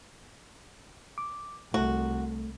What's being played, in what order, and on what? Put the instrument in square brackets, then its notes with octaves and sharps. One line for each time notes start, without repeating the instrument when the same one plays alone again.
[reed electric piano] D6
[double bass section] C2 [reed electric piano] A3 [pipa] F#4